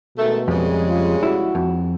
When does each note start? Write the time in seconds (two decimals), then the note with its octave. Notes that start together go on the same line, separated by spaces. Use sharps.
0.18 B2 D#3 G#3 A3
0.48 F2 C#3 G3 G#3
0.88 F4
1.23 E4 F#4
1.55 F2